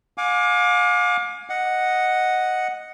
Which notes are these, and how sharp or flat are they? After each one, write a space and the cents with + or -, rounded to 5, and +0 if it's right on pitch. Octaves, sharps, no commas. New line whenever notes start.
F5 +40 G#5 +0 D6 +0
D#5 +0 F#5 +0